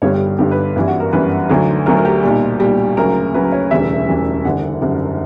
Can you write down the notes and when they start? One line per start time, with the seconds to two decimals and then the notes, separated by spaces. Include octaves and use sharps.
0.02 G1 G2 D3 G3 C#5
0.14 G4
0.26 G4
0.38 G1 G2 D3 G3 G4
0.51 B4
0.76 G1 F#2 E3 G3 E4
0.88 F#4
1.00 A#4
1.12 G1 F#2 E3 G3 B4
1.49 D2 D3 F#3
1.86 D2 D3 F#3 A#4
1.97 A#4
2.05 G4
2.23 B1 A#2 G3
2.60 B1 A#2 G3
2.97 D2 C#3 F#3 A#4
3.34 D2 C#3 F#3 B4
3.52 C#5
3.71 E1 D2 C#3 E3 G3 E5
4.08 E1 D2 C#3 E3 G3
4.45 F#1 F#2 D3 G3 F#5
4.82 F#1 F#2 D3 G3